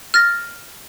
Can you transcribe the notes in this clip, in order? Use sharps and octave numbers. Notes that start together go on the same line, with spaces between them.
F6 A6 A#6